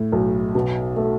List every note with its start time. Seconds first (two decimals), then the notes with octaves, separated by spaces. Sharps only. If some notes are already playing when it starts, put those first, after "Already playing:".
Already playing: A2
0.12 B1
0.55 B2
0.97 A3